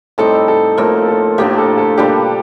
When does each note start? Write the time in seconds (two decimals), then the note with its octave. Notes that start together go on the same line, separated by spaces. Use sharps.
0.18 A2 G3 C4 D#4 A4
0.48 A4
0.78 A2 F3 A#3 A#4
1.08 A4
1.38 A2 F3 A#3 D4 G4
1.58 A4
1.78 A4
1.97 A#2 G3 D4 G4